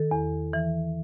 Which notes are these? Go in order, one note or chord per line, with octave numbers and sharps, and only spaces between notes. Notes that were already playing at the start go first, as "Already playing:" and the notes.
Already playing: D#3 A4
E2
E3